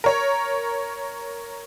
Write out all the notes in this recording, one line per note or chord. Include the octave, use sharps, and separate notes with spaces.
A#4 C#5